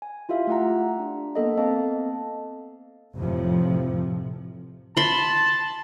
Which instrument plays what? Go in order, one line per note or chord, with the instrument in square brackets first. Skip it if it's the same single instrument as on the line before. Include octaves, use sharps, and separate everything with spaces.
[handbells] G#5
E4 F4 G4 E5 F5
A3 G4 F#5 A#5
D4
A#3 B3 A4 D#5
C4 A4 D#5 F5 A5
[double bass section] F1 F2 A2 C3 F3
[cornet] A5 [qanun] B5 C6